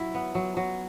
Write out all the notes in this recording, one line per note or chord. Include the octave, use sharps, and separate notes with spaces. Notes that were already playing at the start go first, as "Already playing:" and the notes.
Already playing: F#3 E4
B3
F#3
F#3